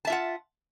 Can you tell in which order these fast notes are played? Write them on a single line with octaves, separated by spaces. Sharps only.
A5 E5 F4 F#5